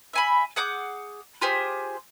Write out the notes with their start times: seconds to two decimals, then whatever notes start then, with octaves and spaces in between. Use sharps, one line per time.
0.13 E5 G#5 B5
0.56 G#4 F#5 D6 G6
1.41 F4 G4 G#4 C5